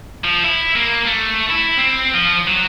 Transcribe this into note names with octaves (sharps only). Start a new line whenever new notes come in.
F3
E4
A#3
A3
E4
C4
F3
F#3